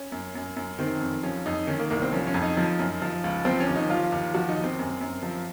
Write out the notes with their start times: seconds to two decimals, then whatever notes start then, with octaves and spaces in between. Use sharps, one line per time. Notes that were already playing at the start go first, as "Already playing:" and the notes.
Already playing: C#4
0.12 F#2
0.35 F#2
0.57 F#2
0.79 D#3 C4
1.01 F2
1.23 F3 C#4
1.46 F2 D#4
1.67 D#3 C#4
1.80 A#3
1.90 C2 A#3
2.02 C4
2.12 F3 C#4
2.27 C#4
2.34 F2
2.42 D#4
2.57 F3
2.79 F#2
3.02 F3
3.24 C#2
3.45 F3 C4
3.60 C#4
3.67 D#2
3.75 D#4
3.90 F3 F4
4.12 D#2
4.34 F3 F#4
4.49 D#4
4.56 D#2
4.64 C4
4.79 F#2
5.01 F#2
5.23 F3